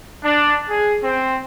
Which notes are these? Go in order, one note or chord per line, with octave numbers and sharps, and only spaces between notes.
D4
G#4
C4